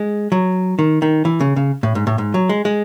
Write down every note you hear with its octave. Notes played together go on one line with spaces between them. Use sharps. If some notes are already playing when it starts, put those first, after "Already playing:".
Already playing: G#3
F#3
D#3
D#3
E3
C#3
C#3
A2
G#2
A2
G#2
F#3
G#3
G#3